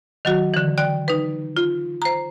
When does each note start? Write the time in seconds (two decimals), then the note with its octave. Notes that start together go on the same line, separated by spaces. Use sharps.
0.25 D#3 F#3 F#4
0.54 D3 E3
0.78 D5 G5 F#6
1.08 D#4 B4
1.57 F4
2.02 C5 A#5